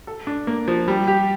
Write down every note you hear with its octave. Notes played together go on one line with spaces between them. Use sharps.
A4
D4
A#3
F3
G3
G4